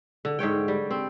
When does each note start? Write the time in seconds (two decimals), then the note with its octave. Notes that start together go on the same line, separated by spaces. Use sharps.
0.25 D3
0.39 G#2 D3 C#5 G5
0.68 G3
0.91 C4